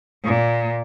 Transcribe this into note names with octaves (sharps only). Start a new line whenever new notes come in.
A#2